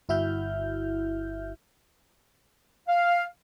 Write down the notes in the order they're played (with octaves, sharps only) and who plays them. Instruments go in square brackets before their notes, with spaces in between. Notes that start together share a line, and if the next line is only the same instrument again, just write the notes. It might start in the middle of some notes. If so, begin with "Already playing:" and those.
[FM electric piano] G1 E4 F#4 E5 F6 G6
[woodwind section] F5